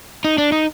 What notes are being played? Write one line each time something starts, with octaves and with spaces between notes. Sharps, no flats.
D#4
D4
D#4